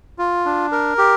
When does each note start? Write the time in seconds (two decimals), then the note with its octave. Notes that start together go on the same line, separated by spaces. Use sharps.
0.19 F4
0.46 D4
0.72 A#4
0.98 G4